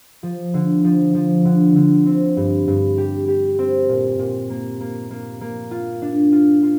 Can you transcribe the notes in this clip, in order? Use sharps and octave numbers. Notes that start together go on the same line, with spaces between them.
F3
D3
F3
F3
D3
D3
C4
G2
G2
G4
G4
C4
A#2
A#2
A#3
A#3
A#3
A#3
F4
D4
F4
F4